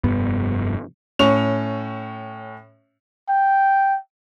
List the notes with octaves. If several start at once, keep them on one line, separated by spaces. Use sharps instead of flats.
F1 G2 B3
A2 C#4 C#6 F7
G5